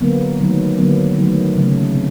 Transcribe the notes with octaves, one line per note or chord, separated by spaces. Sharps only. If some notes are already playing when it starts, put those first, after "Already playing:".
D3 F#3 A#3 B3
D#3 F#3 A3
D3 F#3 A#3 B3
D#3 F#3 A3
C#3 F#3 A3
C3